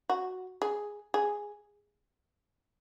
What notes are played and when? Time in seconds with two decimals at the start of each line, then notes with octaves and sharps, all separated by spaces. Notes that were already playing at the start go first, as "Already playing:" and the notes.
0.09 F#4
0.62 G#4
1.14 G#4